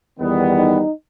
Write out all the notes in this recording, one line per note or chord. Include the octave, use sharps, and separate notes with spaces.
E2 D#3 G3 B3
D#4